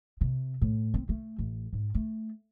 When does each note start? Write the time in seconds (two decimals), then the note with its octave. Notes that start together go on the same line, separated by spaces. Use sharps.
0.21 C3
0.62 A2
0.94 C4
1.09 A3
1.39 A1
1.73 G#2
1.94 A3